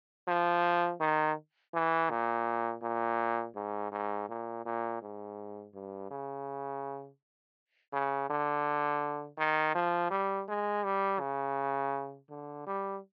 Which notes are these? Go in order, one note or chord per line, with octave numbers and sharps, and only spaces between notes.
F3
D#3
E3
A#2
A#2
G#2
G#2
A#2
A#2
G#2
G2
C#3
C#3
D3
D#3
F3
G3
G#3
G3
C#3
D3
G3